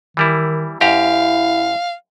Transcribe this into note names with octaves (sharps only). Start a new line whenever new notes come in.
D#3 E3 G3 E4
F#2 E4 G4 F5 A#5